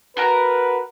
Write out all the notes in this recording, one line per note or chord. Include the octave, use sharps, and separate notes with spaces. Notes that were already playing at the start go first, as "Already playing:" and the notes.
F#4 A#4 B4 A#5